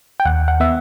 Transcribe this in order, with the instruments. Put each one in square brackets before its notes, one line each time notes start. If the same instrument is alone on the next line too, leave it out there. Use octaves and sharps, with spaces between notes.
[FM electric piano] G5
D#2 F#5
F#5
B3 E5